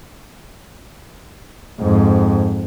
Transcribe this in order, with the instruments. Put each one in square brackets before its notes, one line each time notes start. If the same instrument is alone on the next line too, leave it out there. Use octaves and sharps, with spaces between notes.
[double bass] F2 G#2